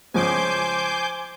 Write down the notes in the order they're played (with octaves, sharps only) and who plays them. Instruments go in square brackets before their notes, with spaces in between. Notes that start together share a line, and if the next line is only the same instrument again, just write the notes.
[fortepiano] C#2 F3 [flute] C5 [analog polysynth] G#5 D6 G6